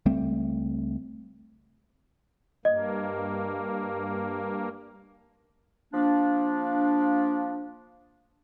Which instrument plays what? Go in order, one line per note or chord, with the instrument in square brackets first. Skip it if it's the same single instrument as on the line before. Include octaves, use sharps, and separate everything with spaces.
[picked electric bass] C#2 G3 A3 C4
[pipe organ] G2 A#3 [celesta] D#5
[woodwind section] F3 A#3 D4